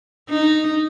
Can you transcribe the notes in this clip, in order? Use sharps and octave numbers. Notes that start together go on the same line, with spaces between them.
D#4